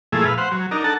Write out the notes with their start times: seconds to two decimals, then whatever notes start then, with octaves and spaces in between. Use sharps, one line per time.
0.12 A#2 F3 A3 E4 G#4
0.25 B4 F5
0.38 C5 F#5
0.51 F#3
0.71 D4 D#4 A#4
0.84 A4 F#5 A5